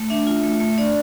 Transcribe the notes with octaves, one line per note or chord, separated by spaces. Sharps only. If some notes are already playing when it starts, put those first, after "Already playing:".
Already playing: A3
D4 E5
F4
A3
A3
D4 D5